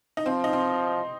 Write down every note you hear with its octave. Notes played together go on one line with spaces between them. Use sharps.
D#4
F3 C4
D#4
C4